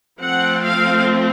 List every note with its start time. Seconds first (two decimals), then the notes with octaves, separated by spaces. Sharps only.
0.21 F3 A3 C4 F#5
0.63 F5